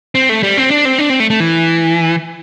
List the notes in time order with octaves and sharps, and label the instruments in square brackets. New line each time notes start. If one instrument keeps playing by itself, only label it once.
[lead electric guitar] C4
A3
G3
C4
D4
C4
D4
C4
A3
A3
E3